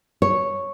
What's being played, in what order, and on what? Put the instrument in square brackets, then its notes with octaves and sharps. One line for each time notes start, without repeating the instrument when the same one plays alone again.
[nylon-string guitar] C#5